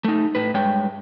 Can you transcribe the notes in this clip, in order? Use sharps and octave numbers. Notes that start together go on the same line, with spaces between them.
A3 D#4
A2 B4
G2 G#3 C#5 G5